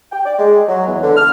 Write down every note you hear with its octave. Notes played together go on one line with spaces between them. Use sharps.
G5
D5
G#3
F#3
E2
D3
F6